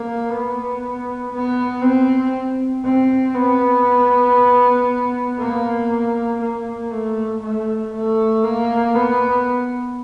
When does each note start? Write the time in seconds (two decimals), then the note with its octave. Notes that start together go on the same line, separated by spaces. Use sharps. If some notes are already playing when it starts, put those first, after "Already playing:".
Already playing: A#3
0.30 B3
1.32 B3
1.82 C4
2.85 C4
3.35 B3
5.39 A#3
6.41 A#3
6.91 A3
7.42 A3
7.93 A3
8.44 A#3
8.95 B3